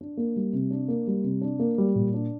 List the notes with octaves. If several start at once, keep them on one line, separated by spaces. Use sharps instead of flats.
D4
A#3
G3
C3
D4
A#3
G3
C3
D4
A#3
G3
A#2
D4